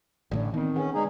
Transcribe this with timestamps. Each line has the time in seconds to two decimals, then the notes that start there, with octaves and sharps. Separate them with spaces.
0.31 A1 A2 D3 E3 D5
0.54 D#3 B3 C4
0.76 C#4 G#4 B4 F#5
0.94 D3 G#3 D#4 G#4 D5